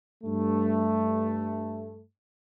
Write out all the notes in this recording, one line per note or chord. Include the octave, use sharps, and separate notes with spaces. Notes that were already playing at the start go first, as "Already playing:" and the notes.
G2 A3